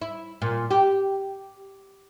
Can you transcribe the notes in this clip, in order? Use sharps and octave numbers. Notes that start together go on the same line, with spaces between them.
E4
A#2
G4